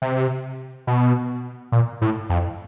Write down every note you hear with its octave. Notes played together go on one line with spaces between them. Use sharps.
C3
B2
A#2
A2
F2